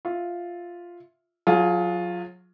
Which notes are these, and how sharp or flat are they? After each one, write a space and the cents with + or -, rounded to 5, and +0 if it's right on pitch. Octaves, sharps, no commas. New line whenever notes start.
F4 +0 E5 +0
F#3 -30 F4 +0 G#4 +20